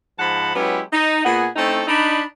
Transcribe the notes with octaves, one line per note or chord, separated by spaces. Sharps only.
G#2 F3 F#5 A5 B5
F#3 G#3 B3 C#4 E4 G4
D#4
A#2 B3 G#4 F#5 G#5 B5
A3 C4 C#4 D#4 E4 A4
D4 D#4 B5